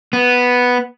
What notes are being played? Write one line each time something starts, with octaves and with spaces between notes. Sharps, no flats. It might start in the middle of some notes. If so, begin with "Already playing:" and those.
B3